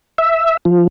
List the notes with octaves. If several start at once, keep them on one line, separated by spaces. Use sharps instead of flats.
E5
F3